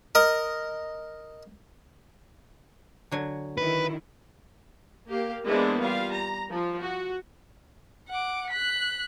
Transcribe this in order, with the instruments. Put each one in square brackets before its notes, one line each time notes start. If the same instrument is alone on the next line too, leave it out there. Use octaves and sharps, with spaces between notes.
[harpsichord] A#4 D#5
[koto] D3 F#3 G#5
[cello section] D#3 E4 [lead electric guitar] B4
[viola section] A#3 G4 F5
E3 G#3 A#3 B3 D4 C5
G3 F4 F5
A#5
F3
F#4
[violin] F#5 D6
F#6 B6